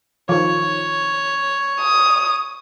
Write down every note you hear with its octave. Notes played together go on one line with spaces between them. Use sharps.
D#3 F3 C#5
D#6